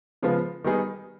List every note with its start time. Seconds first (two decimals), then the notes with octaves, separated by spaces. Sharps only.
0.22 C#3 F3 G#3 B3
0.64 D#3 G3 B3 D#4 G#4